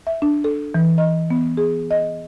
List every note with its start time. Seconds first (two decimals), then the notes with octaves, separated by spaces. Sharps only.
0.07 E5
0.22 D4
0.44 A4
0.74 E3
0.98 D#5
1.30 B3
1.57 G#4
1.91 D#5